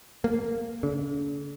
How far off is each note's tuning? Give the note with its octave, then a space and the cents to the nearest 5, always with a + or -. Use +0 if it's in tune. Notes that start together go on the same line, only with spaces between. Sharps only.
A#3 -10
D3 -45